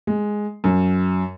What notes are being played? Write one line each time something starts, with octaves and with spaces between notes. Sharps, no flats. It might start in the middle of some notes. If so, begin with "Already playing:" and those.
G#3
F#2